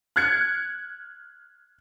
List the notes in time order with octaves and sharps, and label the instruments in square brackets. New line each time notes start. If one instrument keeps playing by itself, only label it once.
[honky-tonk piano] F6 F#6 G#6 C#7